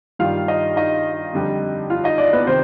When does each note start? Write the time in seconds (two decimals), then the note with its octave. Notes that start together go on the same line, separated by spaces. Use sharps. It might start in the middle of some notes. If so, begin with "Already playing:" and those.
0.19 G2 D#3 G3 F4 F5
0.48 D#4 D#5
0.76 D#4 D#5
1.33 F2 D3 G3
1.90 F4 F5
2.04 D#4 D#5
2.18 D4 D5
2.33 B3 B4
2.47 C3 D#3 C4 C5